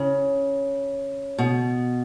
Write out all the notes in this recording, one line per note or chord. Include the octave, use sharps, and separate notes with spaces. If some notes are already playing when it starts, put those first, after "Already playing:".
Already playing: C#3
B2